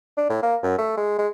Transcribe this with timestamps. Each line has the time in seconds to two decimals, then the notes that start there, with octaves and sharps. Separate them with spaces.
0.17 D4
0.30 A2
0.43 A#3
0.63 F#2
0.79 A3
0.98 G#3
1.18 G#3